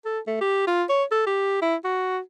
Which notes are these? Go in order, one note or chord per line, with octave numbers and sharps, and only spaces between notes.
A4
A3
G4
F4
C#5
A4
G4
E4
F#4